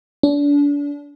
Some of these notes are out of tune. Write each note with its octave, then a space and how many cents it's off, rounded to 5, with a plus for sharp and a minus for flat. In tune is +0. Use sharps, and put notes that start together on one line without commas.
D4 -35